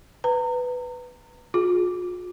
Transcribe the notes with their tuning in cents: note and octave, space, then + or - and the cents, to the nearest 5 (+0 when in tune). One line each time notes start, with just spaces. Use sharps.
B4 +5 A#5 -30
F4 +45 G#4 +0